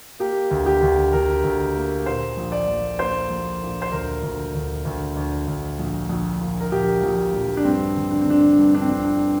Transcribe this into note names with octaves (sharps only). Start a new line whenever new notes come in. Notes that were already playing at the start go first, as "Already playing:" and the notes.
A#3 G4
D2
G4
D2
D2 A#4
D2
A#3
A#2 C5
A#1
D5
A#1
A#3 C5
A#1
A#2
C5
D2 A#4
D2
D2
D2
D2
D2
A#1
A#1
A#2
A#4
A#1 G4
A#1
A#1
D4
G2 C4
D3
D4
C4
D3 D4
G2
D4
C4
G1
D4